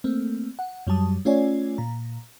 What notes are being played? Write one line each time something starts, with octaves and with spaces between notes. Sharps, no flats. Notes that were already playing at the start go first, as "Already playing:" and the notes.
A3 A#3 C4
F#5
F#2 F#3 G3 A5 D#6
A3 C#4 F4 C#5 D5 G#5
A#2 A#5